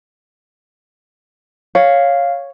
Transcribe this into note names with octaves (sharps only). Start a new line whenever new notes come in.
C#5 F5